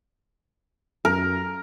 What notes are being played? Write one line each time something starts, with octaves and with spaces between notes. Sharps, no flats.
F#2 A#4